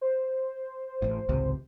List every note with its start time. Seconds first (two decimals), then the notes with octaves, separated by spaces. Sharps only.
0.01 C5
1.02 A1 A2
1.29 G#1 C#2 C3